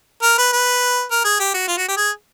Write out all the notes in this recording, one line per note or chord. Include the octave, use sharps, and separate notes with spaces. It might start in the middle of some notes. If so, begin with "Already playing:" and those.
A#4
B4
B4
A#4
G#4
G4
F#4
F4
F#4
G4
G#4